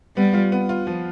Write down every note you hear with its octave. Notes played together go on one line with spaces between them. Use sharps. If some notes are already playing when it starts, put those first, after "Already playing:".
G3 B3
F4
B3
F4
F3